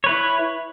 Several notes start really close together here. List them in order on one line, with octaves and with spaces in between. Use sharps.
C#5 B4 E4